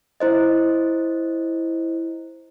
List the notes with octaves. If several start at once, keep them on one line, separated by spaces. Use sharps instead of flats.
E4 C5 D#5